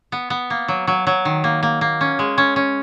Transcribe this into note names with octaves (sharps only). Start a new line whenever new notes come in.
B3
B3
A#3
F#3
F#3
F#3
D#3
A#3
A#3
A#3
C#4
G#3
C#4
C#4